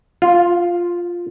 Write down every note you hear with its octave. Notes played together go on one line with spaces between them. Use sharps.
F4